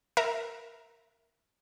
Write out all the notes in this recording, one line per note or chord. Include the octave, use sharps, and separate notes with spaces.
A#4 E5